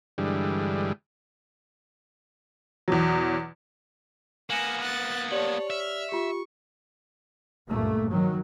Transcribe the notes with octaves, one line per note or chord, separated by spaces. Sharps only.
G2 D3 E3 G3 G#3
E2 B2 F#3
A#3 B3 F#5 G#5 A#6 E7 F#7
F#6 A6
G4 C#5 D5 A5 F#7
E5 F6
F4 G4 C#6
C#2 G2 A#2 A3 A#3
D#3 F#3